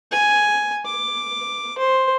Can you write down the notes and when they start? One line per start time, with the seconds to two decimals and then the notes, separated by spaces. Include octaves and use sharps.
0.11 G#5
0.86 D6
1.78 C5